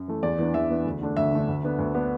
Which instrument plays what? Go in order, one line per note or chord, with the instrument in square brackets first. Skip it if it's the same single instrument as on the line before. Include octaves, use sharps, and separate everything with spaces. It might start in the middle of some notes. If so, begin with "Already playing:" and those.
Already playing: [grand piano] F#2
E3 A3
E2 D5
E3 B3 D4
E2 E5
E3 B3 D4
D2
D3 A3 D4
D2 E5
D3 A3 D4
D2
D3 B3 D4
D2
D3 B3 D4